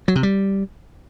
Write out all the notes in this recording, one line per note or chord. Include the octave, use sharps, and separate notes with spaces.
F#3
C3
G3